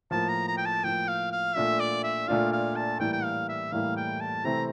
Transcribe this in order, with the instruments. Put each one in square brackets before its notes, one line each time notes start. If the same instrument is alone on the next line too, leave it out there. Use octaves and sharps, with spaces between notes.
[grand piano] A2 F3 A#3 [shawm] A5
[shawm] A#5
A#5
G5
A5
[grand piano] A2 F3 A#3 [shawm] G5
[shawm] F5
F5
[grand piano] A#2 A3 D4 F4 [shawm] E5
[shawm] D5
E5
[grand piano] A#2 A3 D4 F4 [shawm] F5
[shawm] F5
A5
[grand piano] A2 E3 G3 A#3 E4 [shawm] G5
[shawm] G5
F5
E5
[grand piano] A2 E3 G3 A#3 E4 [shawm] F5
[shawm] G5
A5
[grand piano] C3 E3 A3 C4 [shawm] A#5